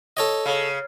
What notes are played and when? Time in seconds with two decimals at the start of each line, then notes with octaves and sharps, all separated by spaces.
0.17 A4 C#5 D#5
0.46 C#3